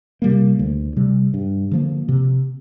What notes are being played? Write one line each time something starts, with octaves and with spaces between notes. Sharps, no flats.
C3 G3 A#3
D2
C3 G3
G2
D3 F3 A#3
C3